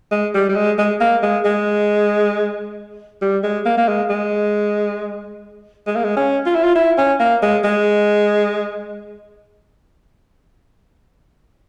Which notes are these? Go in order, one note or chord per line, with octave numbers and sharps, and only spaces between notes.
G#3
G3
G3
G#3
G#3
A#3
G#3
G#3
G3
G#3
A#3
A#3
G#3
G#3
G#3
A#3
G#3
C#4
F4
E4
F4
E4
C#4
A#3
G#3
G#3